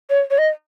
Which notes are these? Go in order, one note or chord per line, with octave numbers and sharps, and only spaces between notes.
C#5
C#5
D#5